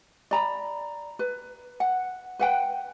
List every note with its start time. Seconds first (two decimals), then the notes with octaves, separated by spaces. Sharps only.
0.31 D5 A#5 B5
1.19 B4
1.80 F#5
2.39 B4 F#5 G5